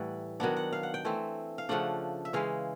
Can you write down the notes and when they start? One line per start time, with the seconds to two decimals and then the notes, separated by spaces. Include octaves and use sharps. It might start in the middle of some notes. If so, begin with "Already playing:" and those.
Already playing: A2 E3 G3 F#5
0.40 D#3 F#3 B3 D4 F#5
0.57 F#5
0.72 F5
0.83 F#5
0.94 G5
1.05 E3 A3 C4
1.58 F5
1.69 C#3 F3 A3 D4 F#5
2.25 E5
2.33 C#3 E3 G#3 F5